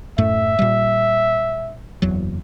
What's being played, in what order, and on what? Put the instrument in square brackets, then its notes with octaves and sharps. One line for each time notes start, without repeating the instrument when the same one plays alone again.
[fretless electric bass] F#2 A2 A3 [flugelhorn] E5
[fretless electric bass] A#2 G3
F#1 E2 F#3